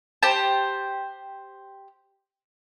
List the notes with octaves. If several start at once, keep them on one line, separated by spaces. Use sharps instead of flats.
G4 C5 A5